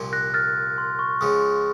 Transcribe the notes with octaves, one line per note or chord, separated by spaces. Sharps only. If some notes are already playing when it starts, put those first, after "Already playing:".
Already playing: C2 A#2 F3
F#6 A#6
F6 A6
C6
C#6
C#2 C#3 F3 D#6